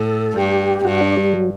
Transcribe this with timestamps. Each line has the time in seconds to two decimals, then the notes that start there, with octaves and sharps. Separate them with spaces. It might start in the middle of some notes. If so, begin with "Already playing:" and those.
Already playing: A2 A4
0.36 G2 G4
0.85 G2 F#4
1.01 D4
1.17 G3
1.33 F#3